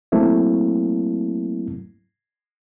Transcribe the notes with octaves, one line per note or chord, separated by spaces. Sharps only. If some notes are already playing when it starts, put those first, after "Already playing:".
F#3 A3 A#3 C4 E4